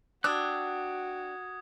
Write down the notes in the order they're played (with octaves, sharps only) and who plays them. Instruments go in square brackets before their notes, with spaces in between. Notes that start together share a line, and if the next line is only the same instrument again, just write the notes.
[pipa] D4 [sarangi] F#4 [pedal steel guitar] G5 E6 F#6 [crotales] D#6 G#6